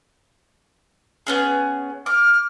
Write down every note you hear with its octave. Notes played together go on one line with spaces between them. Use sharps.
B3 C#4 G#4
D6 F6